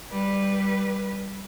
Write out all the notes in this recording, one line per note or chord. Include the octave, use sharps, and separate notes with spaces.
G3 B4